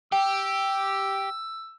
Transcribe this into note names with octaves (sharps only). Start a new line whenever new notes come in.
G4 G5 E6